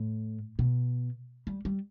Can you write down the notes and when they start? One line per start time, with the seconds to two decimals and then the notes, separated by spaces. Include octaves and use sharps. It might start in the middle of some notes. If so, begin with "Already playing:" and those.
Already playing: A2
0.59 B2
1.47 G3
1.65 G3